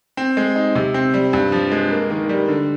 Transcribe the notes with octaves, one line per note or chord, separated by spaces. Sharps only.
C4
G#3
D#4
C3
C4
G3
G2
F3
G#3
A#3
D#3
G3
D3